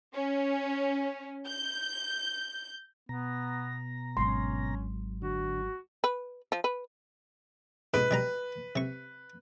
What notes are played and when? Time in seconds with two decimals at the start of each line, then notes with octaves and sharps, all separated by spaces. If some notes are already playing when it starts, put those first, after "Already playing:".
0.14 C#4
1.47 G6
3.09 B2 B3 A#5
4.17 G#1 F#3 C#4 C6
5.22 D3 F#4
6.04 B4
6.52 F3
6.64 B4
7.94 G#2 B2 B4
8.11 B2 G3 A#5
8.76 C3 C#6